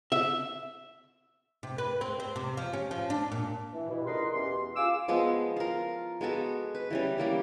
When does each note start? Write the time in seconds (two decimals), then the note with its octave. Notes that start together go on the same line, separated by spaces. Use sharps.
0.12 E5
1.63 C3
1.78 B4
2.01 C4
2.20 C5
2.36 C3
2.57 F3
2.73 C#4
2.91 F3
3.10 D4
3.32 A#2
3.72 E3
3.89 G2 B2 E4
4.06 C#2 D3 A#4 B4 D#5 C6
4.33 E2 B2 E3 C#4 G4 C6
4.76 F4 G#4 F5 G#5 D6 E6
5.08 F3 G#3 B3
5.57 F4 A#4
6.21 G#3 B3 F#4 A4
6.75 B4
6.90 E3 G3 C#4
7.18 G3 A#3 E4